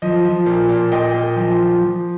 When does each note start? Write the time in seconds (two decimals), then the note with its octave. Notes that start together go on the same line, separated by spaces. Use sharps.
0.02 F3 D#5
0.25 F3
0.46 A#2
0.69 A#2
0.92 A#2 D#5 G5
1.14 A#2
1.36 F3
1.59 F3
1.81 F3